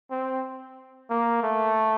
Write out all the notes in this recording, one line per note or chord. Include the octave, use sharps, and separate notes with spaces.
C4
A#3
A3